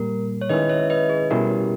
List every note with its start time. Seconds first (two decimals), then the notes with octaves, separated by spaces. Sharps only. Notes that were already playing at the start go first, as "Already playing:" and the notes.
Already playing: A#2 G3 A#3 A#4
0.41 C#5
0.49 D#3 G#3 C#4 E4 B4 D#5
0.69 C#5 E5
0.90 B4 D#5
1.10 G#4
1.30 B2 G3 C#4 E4 G4 A#4